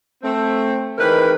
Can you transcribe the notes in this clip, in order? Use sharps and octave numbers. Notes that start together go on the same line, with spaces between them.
A3 C4
D#3 E3 G#3 C4 A#4 B4